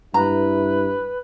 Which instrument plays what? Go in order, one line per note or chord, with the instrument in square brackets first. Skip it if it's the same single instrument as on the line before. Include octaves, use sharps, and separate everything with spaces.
[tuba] G2 [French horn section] E4 [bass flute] B4 [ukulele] A#5